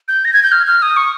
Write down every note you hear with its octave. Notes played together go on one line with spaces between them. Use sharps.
G6
A#6
G#6
G6
F6
F6
D#6
C#6